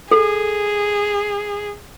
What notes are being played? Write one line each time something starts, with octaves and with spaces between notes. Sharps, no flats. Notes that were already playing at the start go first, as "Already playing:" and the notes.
G#4 A4